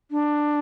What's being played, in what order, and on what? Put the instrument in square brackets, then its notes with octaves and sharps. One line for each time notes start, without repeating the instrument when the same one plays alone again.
[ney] D4